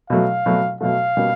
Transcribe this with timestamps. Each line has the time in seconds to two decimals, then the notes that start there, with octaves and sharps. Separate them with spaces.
0.10 B2 F#3 A3 F5
0.46 B2 F#3 A3
0.81 B2 F#3 A3 F5
1.17 B2 G3 A#3 C#4